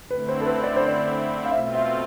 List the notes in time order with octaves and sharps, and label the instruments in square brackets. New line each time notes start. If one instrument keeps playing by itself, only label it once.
[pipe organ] D3 A3 C4 E4 [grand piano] B4
[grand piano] C5
A4
B4
D5
C5
D5
F5
[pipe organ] B2 A3 C4 F4 [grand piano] E5
[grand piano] E5